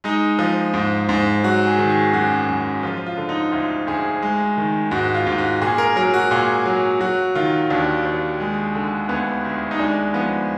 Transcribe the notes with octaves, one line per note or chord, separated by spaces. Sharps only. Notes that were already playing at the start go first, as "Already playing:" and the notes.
G#3 D#4
F3
G#2
G#2
F#3 F#4
G#4
D#3
G#4
F#2 F#4
F#2
F3 F4
F4
D3
D#4
D2 F4
D2 G#4
G#3
D#3
G#2 F#4
F4
G#2
F#4
A#2 G#4
A#4
F#3 A#4
F#4
A#2 G#4
F#3
F#3 F#4
D#3 F4
D#2 D4
D#2
G#3
D3
D2 B3
D2
D#4
G#3 D4
F3 B3